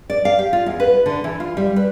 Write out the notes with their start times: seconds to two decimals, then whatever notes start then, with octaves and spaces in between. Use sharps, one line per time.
0.10 D5
0.25 F5
0.39 G4
0.53 F4
0.66 E2
0.80 B4
1.06 D3
1.24 E3
1.40 F4
1.57 G3
1.76 B4